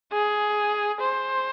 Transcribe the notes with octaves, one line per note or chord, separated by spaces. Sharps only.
G#4
C5